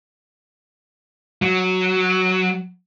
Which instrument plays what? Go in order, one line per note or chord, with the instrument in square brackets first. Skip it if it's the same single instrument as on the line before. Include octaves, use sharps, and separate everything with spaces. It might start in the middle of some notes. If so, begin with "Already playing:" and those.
[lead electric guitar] F#3